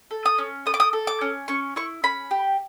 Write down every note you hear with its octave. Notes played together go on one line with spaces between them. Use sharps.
A4
D#6
C#4
A4 D#6
D6
D#6
A4
D6
C#4
C#4 C#6
E4 C#6
C#4 B5
G4